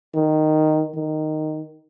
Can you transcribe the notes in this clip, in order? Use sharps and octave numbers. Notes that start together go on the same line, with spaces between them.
D#3
D#3